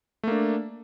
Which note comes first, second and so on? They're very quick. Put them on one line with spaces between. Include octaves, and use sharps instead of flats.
A3 A#3 D4